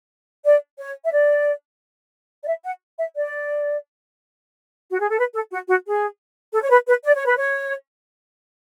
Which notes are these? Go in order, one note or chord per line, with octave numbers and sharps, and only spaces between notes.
D5
C#5
E5
D5
D5
E5
F#5
E5
D5
F#4
G#4
A4
B4
A4
F#4
F#4
G#4
A4
C#5
B4
B4
D5
C#5
B4
C#5